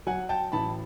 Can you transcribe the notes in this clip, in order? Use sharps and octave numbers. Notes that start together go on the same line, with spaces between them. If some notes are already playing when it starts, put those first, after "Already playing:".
F#3 F#5 G#5
G5 A5
A1 A5 B5